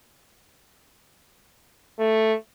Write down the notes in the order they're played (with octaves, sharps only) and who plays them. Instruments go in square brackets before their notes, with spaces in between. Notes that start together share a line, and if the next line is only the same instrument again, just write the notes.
[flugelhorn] A3